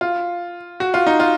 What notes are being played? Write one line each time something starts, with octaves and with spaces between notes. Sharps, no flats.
F4
F#4
F4
D#4
F4